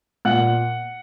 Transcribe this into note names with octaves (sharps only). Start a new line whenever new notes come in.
A#2 F#5 F#6